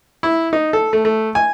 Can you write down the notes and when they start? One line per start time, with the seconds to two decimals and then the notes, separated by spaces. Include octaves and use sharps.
0.23 E4
0.53 D#4
0.73 A4
0.93 A3
1.05 A3
1.35 G#5